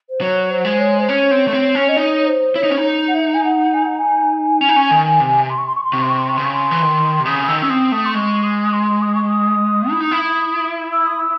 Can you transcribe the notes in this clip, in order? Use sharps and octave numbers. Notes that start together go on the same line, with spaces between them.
C5
F#3 C#5
C5
G#3
C#5
C5
C#4 C#5
C4
A3
C4
C#4
D#5
D#4 C#5
C5
E4 C#5
D#4
C#4
D#4
F#5
E5
G#5
F#5
G#5
F#5
G#5
C#4
D#4
C#4
D#3
C3
C6
C#6
C6
C#6
C6
C3 C#6
C6
C#6
C6
C#6
C#3 C6
C#6
C6
E3
D#3
C3
C#3 D#6
D#6
D#3 E6
C#4 E6
C4 D#6
A3 D#6
C6
G#3 C#6
D#6
C6
D#6
C#6
D#6
E4
D#4
E4
E6
D#6
E6